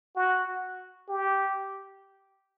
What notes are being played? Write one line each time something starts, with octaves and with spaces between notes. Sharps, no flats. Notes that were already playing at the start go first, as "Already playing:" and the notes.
F#4
G4